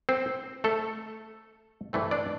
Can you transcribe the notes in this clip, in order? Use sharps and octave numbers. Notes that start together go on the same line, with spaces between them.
C4 C5
A3 A4
G2 E3 A3 C4
D4 D5